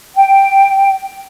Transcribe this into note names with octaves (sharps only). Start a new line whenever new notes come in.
G5